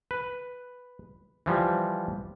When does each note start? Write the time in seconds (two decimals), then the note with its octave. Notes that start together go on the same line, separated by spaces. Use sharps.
0.11 B4
1.46 E3 F3 G3